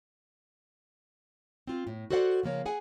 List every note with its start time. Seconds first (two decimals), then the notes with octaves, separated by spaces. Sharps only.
1.67 C4 F4
1.87 A2
2.10 F#4 A4 C5 D5 F#5
2.43 C#3 F3 A#3 C#5
2.66 G#4 F#5 G#5